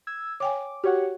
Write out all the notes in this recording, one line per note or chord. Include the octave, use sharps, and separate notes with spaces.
E6 G#6
C#5 G5 G#5 D6
F#4 G4 C#5 F#5